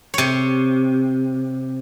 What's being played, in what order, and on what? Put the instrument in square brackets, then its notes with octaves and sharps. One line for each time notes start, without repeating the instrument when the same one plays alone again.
[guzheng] C3 C#5